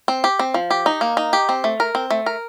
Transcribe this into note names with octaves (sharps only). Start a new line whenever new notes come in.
C4
G4
C4
F3
G4
D#4
A#3
D#4
G4
C4
A3
A#4
C4
A3
A#4